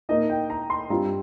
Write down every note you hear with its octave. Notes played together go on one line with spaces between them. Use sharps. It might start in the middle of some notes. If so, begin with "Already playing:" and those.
A#2 A#3 D#4 D#5
G5
A#5
C6
G2 G3 C4 F4 A#5